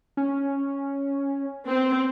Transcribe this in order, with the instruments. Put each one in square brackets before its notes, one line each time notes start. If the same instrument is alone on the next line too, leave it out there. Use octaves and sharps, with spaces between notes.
[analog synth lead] C#4
[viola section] C4